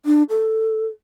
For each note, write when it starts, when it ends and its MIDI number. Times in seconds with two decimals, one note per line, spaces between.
0.06 0.23 62
0.30 0.86 69